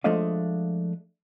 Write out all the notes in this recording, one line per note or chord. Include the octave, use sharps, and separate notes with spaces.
F3 G#3 A3 D4 D#5 F5